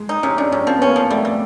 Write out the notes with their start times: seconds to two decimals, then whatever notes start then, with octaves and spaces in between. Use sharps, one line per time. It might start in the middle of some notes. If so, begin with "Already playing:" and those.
Already playing: G#3
0.09 D#4
0.23 C3 C#4
0.37 C3 D4
0.52 C3 C#4
0.67 F3 C4
0.79 B3 C#4
0.88 A#3
0.96 F3
1.10 G3 A3
1.25 G3